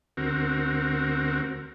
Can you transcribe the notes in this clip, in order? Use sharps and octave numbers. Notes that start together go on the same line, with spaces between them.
D2 C4 F#4 A#4